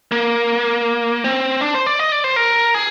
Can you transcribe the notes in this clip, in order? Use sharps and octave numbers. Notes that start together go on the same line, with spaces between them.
A#3
C4
D4
C5
D5
D#5
D5
C5
A#4
G#4